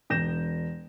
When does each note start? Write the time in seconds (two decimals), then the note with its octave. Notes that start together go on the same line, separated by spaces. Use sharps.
0.10 E1 G6 A#6 E7